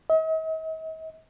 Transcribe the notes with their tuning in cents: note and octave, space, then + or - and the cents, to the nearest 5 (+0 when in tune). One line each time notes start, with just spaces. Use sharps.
D#5 +45